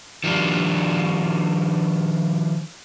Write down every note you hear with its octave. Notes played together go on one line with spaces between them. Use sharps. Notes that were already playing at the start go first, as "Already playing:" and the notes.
D#3 F3 G3 D4